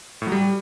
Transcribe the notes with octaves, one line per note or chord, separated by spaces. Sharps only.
A2
F#3
G3